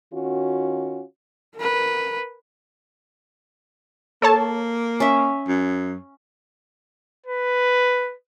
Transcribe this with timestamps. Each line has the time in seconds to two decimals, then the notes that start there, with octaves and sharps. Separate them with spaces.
0.13 D#3 C#4 F4 F#4
1.57 A#4 B4
4.22 A#3 A4 C#5 A5
5.00 C#4 E5
5.48 F#2
7.26 B4